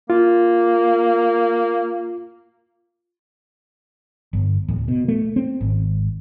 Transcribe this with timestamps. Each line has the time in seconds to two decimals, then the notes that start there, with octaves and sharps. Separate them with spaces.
0.10 A#3 F4
4.33 G1
4.68 D1
4.88 B2
5.08 A3
5.36 C4
5.61 G#1